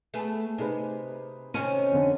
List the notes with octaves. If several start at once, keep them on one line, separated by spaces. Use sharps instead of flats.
A3 B3 G#4
C3 D#4 G#4 B4
C3 D#3 C4 C#4 G#5 D#7
F2 D3